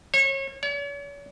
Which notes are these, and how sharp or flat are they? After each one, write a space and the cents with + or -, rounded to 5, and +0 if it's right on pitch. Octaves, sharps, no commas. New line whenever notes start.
C#5 -30
C#5 +45